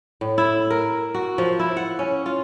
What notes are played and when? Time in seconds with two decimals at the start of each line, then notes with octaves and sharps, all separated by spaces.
0.21 A2
0.38 E4
0.70 A#4
1.14 F#4
1.38 F3
1.59 E4
1.77 F#5
1.99 C#4
2.26 F4